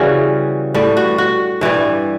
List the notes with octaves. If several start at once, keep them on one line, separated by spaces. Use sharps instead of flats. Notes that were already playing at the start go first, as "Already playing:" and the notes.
Already playing: C#3 E3 G3 C#4 F#4
A2 G3
F#4
F#4
G2 E3 G3